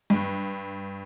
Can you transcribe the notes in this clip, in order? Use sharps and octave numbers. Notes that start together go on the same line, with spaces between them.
G2